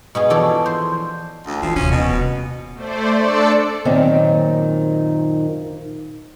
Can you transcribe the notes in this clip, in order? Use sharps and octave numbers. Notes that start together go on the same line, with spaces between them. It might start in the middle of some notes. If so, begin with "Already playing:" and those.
B2 B3 G#4
E3 F3 E4 A4 C#5 D5
C5
D2
E3 F3
D#1 C3 C#4
B2
A3 C5 D5
D4 A4 D5 E6 C#7
F#2 A#2 D#3 C4 D#4